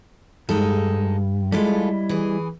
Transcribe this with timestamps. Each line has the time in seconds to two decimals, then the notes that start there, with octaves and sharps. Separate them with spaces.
0.49 G2 G#3 D#4 A4
1.52 G3 G#3 E4 F4 A4 D#5
2.09 E3 G#4